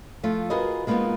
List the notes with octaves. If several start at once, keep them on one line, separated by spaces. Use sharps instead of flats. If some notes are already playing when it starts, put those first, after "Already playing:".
F3 A3 F4
F4 F#4 G#4 A#4 B4 D#5
G#3 A#3 B3 D4 D#4 F4